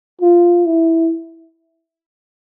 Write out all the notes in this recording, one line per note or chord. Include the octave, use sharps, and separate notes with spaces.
F4
E4